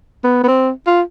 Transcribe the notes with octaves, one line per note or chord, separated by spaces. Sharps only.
B3
B3
C4
F4